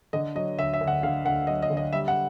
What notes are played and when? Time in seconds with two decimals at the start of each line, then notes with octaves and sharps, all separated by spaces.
0.13 D3 D#5
0.35 F#3 D#5
0.59 D2 E5
0.73 E5
0.81 D2
0.88 F#5
1.03 D3 F5
1.25 D2 F#5
1.47 F#3 D#5
1.62 D#5
1.70 D3
1.77 D#5
1.93 G3 E5
2.08 F#5